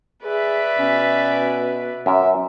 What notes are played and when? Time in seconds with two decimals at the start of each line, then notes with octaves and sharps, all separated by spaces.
0.24 G#4 B4 D5 E5
0.79 B2 C#4
2.06 F#2 A#4 E5